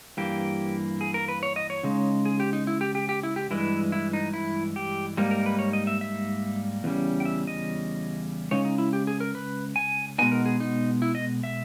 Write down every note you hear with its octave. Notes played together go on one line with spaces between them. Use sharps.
G2 E3 A#3 G4
G#4
A#4
B4
C#5
D#5
C#5
C#3 G#3 D#4
G#4
G4
D#4
E4
G4
G4
G4
E4
G4
G2 E3 G#3 E4
E4
D#4
E4
G4
G#2 G3 A#3 D#4
A#4
B4
C#5
D#5
E5
E5
E2 C#3 G3 C#4
G5
E5
D#5
C#3 G#3 D#4 C#5
D#4
E4
G4
G#4
A#4
B4
G#5
B2 G#3 B3 D#4 G#5
A#4
G#4
D#4
E4
D#5
E5